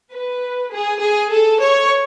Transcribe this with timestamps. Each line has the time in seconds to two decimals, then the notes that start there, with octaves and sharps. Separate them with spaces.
0.12 B4
0.72 G#4
1.02 G#4
1.31 A4
1.61 C#5